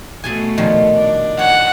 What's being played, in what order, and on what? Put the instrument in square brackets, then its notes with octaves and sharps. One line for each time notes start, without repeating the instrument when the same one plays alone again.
[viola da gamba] B2 A3 [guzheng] G#4 A4 G#5
[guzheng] A#2 D#3 F3
[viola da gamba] D4
[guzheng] C#5 [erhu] F#5